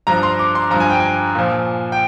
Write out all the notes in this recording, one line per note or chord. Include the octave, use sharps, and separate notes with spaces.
G2 F3 A#5
C6
D6
C6
G2 F3 A#5
G#5
G5
G#5
A#2 F3
G5